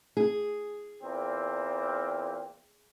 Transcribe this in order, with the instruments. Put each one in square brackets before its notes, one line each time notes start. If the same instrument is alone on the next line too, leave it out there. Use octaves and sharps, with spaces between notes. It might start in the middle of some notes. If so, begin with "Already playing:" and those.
[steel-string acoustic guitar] G#4
[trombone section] E2 A#2 C4